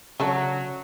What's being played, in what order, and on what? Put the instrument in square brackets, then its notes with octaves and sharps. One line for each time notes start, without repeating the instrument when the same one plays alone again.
[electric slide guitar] C#3 [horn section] F#3 [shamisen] A3 D4 A4